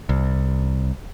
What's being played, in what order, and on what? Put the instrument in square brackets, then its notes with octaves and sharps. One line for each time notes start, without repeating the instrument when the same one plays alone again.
[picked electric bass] C2